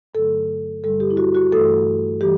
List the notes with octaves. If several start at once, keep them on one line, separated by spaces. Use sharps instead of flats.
G2 D3 F#3 A3 A4
G2 D3 G3 A4
G4
E4
F#4
F#4
G2 E3 A3 A4
E3 G3 G4